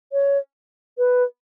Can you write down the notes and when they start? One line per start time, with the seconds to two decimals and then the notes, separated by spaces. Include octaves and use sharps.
0.13 C#5
0.98 B4